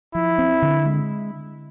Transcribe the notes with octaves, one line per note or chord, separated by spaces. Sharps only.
F3 E4
C4
D3
G#3